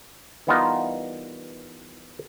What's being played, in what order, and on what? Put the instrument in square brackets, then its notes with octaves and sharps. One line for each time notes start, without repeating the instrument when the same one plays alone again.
[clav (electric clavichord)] E3 G3 B3 D#4 F4 A#4